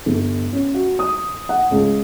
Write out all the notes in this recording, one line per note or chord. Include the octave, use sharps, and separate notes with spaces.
G1
C#4
F#4
D#6
F#5
C#2